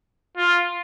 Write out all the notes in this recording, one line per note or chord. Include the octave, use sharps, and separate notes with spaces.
F4